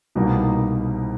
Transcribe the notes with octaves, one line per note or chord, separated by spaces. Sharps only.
C2 B2 G3 A#3 D#4